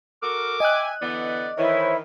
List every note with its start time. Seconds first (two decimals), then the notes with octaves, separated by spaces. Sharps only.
0.22 F#4 A4 A#4 D6
0.60 D#5 E5 G5 G#5 F#6
1.01 D3 E3 B3 D5
1.58 D#3 E3 E4 C5 C#5 E5